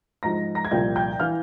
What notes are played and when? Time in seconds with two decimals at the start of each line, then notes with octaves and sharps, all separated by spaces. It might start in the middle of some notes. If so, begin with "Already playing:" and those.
0.23 G#2 F3 A#5 A#6
0.55 A#5 A#6
0.65 G#6
0.71 C2 A#2 F3 G5 G6
0.96 G5 G6
1.20 E3 F5 F6